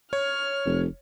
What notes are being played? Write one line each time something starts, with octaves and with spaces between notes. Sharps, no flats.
C#5 F6
F1